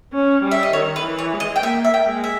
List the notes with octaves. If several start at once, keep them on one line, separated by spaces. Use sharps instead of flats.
C#4
G3
E5
D#5
D#3 C#5
B4
E3
C#5
G#3
D#5
G5
A#3 E5
E5
G5
G#3
E5